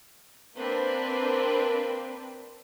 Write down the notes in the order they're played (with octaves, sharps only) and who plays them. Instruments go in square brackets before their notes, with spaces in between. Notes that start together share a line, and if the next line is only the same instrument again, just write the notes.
[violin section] A#3 C4 D4 B4